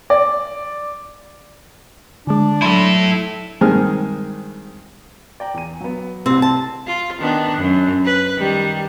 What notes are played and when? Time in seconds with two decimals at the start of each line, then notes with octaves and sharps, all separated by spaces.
0.10 D5
2.27 D3 G#3 D4
2.62 F#3 E4 A4 B5 C6
3.61 G2 D#3 G#3 C4 G#4 F6
5.40 D5 G5 A#5
5.54 E2 D#7
5.81 F#3 B3
6.26 C2 C3 C4
6.42 A5
6.87 F4
7.20 D#3 B3 D4
7.58 F#2
8.06 B4
8.38 D#3 G3